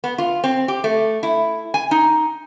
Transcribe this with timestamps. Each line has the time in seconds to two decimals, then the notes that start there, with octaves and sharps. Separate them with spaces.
0.04 B3
0.18 F4
0.44 C4
0.68 G4
0.84 A3
1.23 E4
1.74 G#5
1.91 D#4